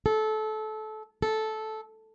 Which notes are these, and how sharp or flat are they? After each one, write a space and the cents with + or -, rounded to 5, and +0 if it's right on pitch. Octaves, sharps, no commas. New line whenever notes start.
A4 -25
A4 -10